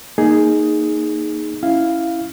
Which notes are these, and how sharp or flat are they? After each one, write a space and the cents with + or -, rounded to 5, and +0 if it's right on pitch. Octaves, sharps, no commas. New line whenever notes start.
A#3 +0 D#4 +0 G#4 +5
C#4 +0 E4 +0 F5 +0